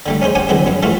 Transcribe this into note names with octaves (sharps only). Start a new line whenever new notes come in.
D3 G3 A3
C#4 D#4 G#4 C5
C#4 G4 F#5 G#5
D3 E3 F#3 G#3 C4
F#2 B3
E3 G#3 A3 F4 F#4